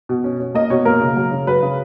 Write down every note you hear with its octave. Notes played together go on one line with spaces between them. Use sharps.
B2
C#4
C#4
A#3 D#5
B2 C#5
A#3 A#4
C#3
F#3
C#3
F#3 B4
C#3